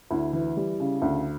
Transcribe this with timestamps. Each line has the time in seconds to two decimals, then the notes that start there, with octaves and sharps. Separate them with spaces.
0.11 D2 E4
0.33 E3
0.57 G3
0.80 C#3
1.02 D2